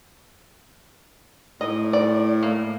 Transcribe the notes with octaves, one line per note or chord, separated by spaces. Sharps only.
A2 D#5
D5
A#3